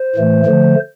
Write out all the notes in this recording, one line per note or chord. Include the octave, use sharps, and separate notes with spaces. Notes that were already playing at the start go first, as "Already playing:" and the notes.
Already playing: C5
A2 E3 A3
D3 F3 A3